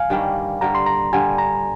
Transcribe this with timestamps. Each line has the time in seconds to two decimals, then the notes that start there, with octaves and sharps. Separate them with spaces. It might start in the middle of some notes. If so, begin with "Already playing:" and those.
Already playing: F5 G#5
0.10 G2 D#3 G3 A#3
0.61 G2 D3 G3 A#5
0.75 C6
0.86 A#5
1.13 G2 D3 G3 G#5
1.38 A#5